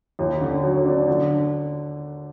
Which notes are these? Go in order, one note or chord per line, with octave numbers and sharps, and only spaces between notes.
D#2
D3
F#3
D4
D3